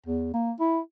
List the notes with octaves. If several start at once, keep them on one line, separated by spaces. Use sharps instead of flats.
E2
A#3
E4